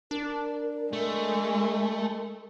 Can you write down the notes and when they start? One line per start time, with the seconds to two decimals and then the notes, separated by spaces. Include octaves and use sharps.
0.11 D4 A#4
0.93 G#3 A3